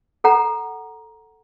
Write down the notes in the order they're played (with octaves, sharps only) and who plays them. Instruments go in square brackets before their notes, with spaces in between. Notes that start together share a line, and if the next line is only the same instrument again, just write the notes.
[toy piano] A4 F#5 A#5